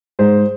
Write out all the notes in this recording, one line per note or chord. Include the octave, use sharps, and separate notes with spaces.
G#2 C5